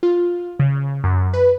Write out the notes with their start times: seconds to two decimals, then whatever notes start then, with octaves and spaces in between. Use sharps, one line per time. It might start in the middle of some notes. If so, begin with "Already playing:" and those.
0.03 F4
0.59 C#3
1.04 F#2
1.33 B4